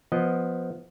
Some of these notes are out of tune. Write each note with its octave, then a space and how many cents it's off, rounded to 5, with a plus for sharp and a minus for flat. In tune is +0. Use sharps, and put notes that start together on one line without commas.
F3 +0 B3 +0 D#5 +0